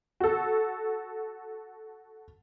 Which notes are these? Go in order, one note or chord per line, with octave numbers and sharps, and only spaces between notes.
F#4 A4